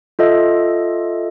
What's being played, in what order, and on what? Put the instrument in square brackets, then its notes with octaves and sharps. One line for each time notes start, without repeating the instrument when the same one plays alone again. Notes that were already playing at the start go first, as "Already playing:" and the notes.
[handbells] F4 A4 D#5 E5